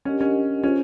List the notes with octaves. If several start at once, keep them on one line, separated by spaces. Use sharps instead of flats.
C#4 D4 G4 A#4 D#5 F#5
C#4
C#4 F4 G#4 C5